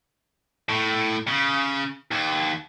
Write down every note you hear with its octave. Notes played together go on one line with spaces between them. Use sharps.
A2
C#3
D#2